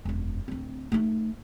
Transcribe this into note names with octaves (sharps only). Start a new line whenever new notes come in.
E1 F#2
D1 C4
A3 D#4